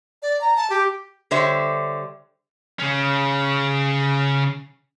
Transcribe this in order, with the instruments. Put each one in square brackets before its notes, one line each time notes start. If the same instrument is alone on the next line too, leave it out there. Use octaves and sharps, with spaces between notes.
[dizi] D5
A#5
A5
G4
[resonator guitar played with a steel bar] D3 G3 C5 C#5 E5
[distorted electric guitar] C#3 C#4